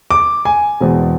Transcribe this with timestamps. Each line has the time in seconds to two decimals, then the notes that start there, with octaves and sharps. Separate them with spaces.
0.11 D6
0.45 G#5
0.80 E2 B2 G#3 C4